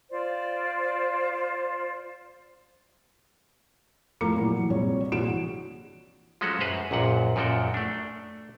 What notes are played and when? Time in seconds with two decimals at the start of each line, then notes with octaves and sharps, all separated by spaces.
0.10 F4 C5 D5
4.21 A2 F3 A#4 A#5 D6 C#7
4.35 A#2 E3 F#3
4.70 A#1 C3 G3 C#5
5.12 A#1 E3 F#4 D7 E7
6.41 F3 F#3 G#3 C#4 F#4 A4
6.60 F#2 B4 C5 A#5
6.91 A#1 F#2 A#2 F#5
7.36 F#2 A#2 F3 F#4 A4 G5
7.74 A3 D4